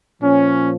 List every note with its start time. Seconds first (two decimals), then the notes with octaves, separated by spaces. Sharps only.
0.22 A#2 F3 C#4